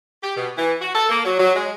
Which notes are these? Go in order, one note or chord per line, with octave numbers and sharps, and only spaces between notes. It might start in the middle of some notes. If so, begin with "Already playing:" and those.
G4
B2
E3
F#4
A4
A#3
F#3
F#3
G#3